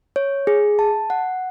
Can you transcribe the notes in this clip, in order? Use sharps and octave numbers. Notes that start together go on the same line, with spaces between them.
C#5
G#4
A5
F#5